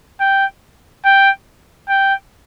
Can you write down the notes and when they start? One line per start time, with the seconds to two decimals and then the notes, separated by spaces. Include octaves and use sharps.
0.20 G5
1.05 G5
1.89 G5